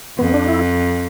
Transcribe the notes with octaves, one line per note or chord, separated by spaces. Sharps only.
F2 B3
D4
E4